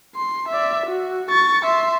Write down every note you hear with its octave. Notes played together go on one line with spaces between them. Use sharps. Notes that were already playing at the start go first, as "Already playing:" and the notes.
C6
D5 E5
F#4
C#6 A6
E5 C6